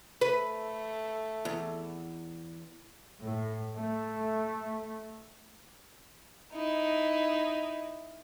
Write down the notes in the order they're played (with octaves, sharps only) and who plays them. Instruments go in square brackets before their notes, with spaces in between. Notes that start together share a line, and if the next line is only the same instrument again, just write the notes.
[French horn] A3 [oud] B4
[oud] E2
[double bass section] A2
A3
[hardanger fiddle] D#4 E4